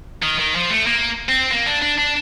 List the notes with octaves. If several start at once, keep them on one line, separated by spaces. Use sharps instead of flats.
D#3
D#3
F3
A3
A#3
C4
A#3
D4
D4
D4